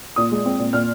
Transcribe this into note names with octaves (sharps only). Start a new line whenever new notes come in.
A#2 D#6
G#3
C4
A#2
A#2 F6